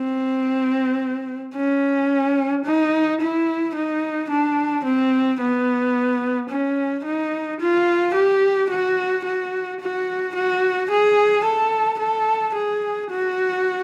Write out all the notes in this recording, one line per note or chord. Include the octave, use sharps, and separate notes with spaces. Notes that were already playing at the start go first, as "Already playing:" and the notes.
Already playing: C4
C#4
D#4
E4
D#4
D4
C4
B3
C#4
D#4
F4
G4
F#4
F#4
F#4
F#4
G#4
A4
A4
G#4
F#4